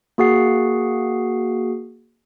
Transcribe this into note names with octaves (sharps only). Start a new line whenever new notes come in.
A#3 F#4 G#4 F#5 C7